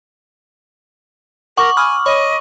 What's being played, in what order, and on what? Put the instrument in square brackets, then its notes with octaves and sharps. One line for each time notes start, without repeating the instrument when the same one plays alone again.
[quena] A#4 [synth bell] F#5 [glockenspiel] C#6 D6 F#7
[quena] G#5 [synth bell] B5 D#6 F6
[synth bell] C#5 B5 [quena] D#5